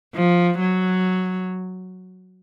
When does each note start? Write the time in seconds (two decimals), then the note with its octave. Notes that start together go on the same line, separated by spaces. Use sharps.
0.15 F3
0.59 F#3